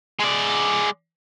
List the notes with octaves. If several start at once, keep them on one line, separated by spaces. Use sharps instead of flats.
G#3 D5